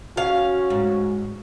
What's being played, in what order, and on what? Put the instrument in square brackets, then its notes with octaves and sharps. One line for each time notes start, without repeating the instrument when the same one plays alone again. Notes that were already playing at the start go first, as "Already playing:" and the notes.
[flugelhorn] C#4 [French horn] F#4 [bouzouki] F5
[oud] G#2